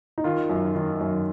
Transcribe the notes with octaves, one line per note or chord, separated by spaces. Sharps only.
D#4
D#3 F4
F#2
D#3
F#2